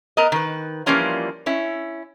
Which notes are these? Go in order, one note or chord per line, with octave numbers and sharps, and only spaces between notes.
B3 A#4 D#5
D#3 B4
E3 F3 G3 A#3 C#4 F4
C#4 E4